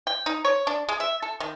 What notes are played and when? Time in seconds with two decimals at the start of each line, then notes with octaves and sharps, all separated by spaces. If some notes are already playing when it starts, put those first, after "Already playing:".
0.07 G5
0.26 D#4
0.45 C#5
0.67 D4
0.89 G#3
1.00 E5
1.22 A4
1.40 D#3